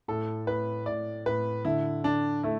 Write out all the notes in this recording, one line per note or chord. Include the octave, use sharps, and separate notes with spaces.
A2 A4
A2 B4
A2 D5
A2 B4
D3 E4
D3 D4
A3 E4